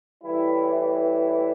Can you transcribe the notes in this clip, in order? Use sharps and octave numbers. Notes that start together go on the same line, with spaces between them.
A2 E3 G3 E4
E4